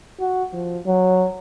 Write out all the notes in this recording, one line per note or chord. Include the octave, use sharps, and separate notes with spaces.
F#4
F3
F#3